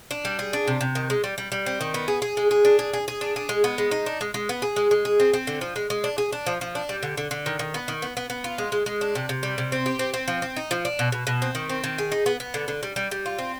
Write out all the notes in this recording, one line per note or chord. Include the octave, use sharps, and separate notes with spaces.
D4
G3
G#4
D4
C3
C3
D#3
G#3
G3
G3
G3
C4
D#3
B3
G#4
G#4
G#3
G#4
D4
G#4
G#4
G#4
D4
G#4
G#3
B3
G#3
D#4
D4
G#3
G#3
B3
G#4
G#3
G#3
G#4
C4
C4
D3
F3
G#3
G#3
D4
G#4
D4
F3
F3
D4
G3
D3
D3
D3
D#3
D#3
B3
D#3
B3
B3
B3
F4
G#3
G#3
G#3
D4
C3
C3
G3
C3
C4
G4
C4
C4
F3
C4
D#4
F3
D4
B2
B2
B2
C4
D#3
C4
D#3
G#4
D#4
B3
B3
D3
D3
G3
G3
G3
F4
C4